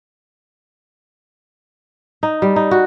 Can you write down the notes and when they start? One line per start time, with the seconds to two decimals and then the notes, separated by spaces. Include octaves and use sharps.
2.23 D#4
2.42 G3
2.56 D#4
2.71 F#4